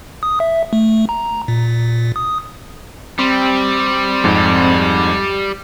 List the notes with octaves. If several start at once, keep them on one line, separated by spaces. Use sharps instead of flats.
D#6
E5
A3
A#5
A#2
D#6
G3 C4
F2 G#2